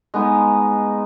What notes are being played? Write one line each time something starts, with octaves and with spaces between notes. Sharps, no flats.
G#3 B3 D#4